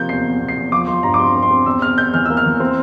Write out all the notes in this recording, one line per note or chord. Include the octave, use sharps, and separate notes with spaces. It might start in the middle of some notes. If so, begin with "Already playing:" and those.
Already playing: C3 F3 A#3 G6
E2 C7
E2
E2
C7
E2
F3 D6
F3 C6
G2 A#5
D6
C4 C6
C4
C6
C4
E2 E6
E2 F6
E2 G6
E3 F6
A#3 E6
F6
E3
C4